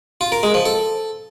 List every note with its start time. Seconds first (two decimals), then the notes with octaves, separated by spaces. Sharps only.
0.21 F4
0.32 A#4
0.43 G#3
0.54 F3
0.65 A4